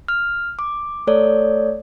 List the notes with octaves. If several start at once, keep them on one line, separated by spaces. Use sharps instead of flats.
F6
D6
A3 A4 C#5 D5